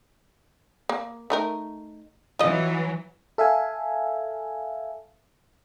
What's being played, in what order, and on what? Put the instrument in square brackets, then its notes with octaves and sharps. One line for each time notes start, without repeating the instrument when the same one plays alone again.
[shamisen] A#3
A3 D#4 A#4
[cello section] E3 F#3 [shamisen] F4 D#5
[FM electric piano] A4 E5 F5 G#5